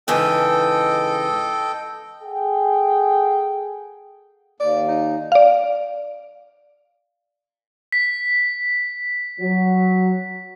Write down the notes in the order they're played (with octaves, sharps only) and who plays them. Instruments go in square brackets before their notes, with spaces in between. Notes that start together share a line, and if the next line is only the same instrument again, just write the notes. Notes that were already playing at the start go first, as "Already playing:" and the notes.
[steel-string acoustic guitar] G#2 C#3 E3 [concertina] A4 D#5 G5
[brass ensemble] G#4 A4 F#5 G5
[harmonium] D#2 [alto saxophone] D5
[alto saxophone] D#4
[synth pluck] D5 F5
[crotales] B6
[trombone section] F#3